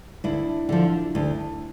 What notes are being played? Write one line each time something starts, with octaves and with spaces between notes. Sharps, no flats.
D2 D4 E4
D3 F3
D2